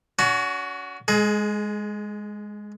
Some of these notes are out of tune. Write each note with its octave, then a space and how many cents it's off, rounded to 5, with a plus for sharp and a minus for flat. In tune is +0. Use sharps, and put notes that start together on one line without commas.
C#4 +40 F#4 +0
G#3 +0 G#4 +30